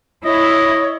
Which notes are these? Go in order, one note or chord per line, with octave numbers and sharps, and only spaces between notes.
E4 C#5 D#5